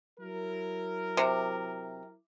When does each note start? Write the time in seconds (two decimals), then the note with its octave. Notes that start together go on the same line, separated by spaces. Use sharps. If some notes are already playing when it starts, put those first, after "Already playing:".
0.19 F#3 E4 A#4
1.17 C3